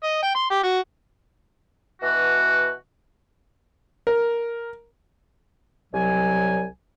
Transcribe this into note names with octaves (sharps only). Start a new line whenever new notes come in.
D#5
G5
C6
G4
F#4
B2 E3 F#4
A#4
C2 F#3 G#5